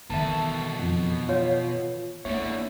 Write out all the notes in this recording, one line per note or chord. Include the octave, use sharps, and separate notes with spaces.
B2 D#3 E3 A4 E5 A5
F2
F4 C#5
E2 D3 A#3 C#5 E5